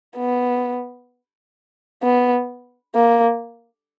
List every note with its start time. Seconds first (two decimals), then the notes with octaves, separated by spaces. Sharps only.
0.17 B3
2.03 B3
2.95 A#3